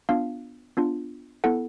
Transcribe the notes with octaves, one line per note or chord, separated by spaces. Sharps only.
B3 D4 F4 F5
B3 D4 F4
B3 E4 A4 F#5